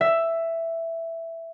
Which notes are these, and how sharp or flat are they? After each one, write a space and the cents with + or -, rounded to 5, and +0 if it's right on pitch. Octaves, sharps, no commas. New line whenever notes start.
E5 +5